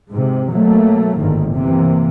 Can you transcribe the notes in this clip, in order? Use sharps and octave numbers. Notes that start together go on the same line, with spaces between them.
G#2 C3
B2 F#3 A3 A#3
G1 G#2 D#3
C3 E3 A#3